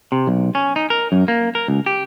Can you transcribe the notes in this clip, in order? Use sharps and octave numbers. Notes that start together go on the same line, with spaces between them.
C3
B1
C#4
D#4
A#4
F#2
A#3
A#4
C#2
G4